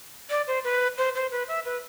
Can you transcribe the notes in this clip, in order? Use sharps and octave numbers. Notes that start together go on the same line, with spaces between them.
D5
C5
B4
C5
C5
B4
E5
B4